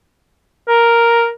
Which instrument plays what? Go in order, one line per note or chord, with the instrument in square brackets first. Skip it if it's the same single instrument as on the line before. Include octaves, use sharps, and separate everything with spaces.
[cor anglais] A#4